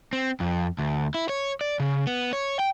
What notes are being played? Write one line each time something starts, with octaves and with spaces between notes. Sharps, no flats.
C4
F2
D2
E4
C#5
D5
C#3
B3
C#5
G5